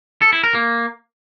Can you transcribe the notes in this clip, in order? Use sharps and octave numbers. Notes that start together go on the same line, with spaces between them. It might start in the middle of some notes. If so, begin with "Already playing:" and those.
A4
E4
A#4
A#3